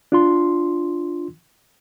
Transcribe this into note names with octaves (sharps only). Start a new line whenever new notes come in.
D4 F4 C6